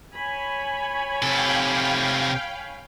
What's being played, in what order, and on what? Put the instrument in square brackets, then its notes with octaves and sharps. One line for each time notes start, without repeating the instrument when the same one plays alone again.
[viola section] C#5 G#5 B5
[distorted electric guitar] C3 A4 [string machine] F5 G5